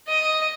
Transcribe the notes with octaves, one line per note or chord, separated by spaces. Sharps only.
D#5